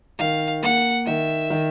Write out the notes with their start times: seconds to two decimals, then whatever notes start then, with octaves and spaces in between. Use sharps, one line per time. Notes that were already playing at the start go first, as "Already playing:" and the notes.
0.19 D#3 F5
0.63 A#3 F#5
1.06 D#3 E5
1.50 D#3